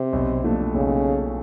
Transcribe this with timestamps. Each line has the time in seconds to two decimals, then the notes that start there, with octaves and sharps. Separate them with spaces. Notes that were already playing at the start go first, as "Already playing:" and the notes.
Already playing: C3
0.13 B1
0.43 A#2 F3 A3 D4
0.74 B1 C#3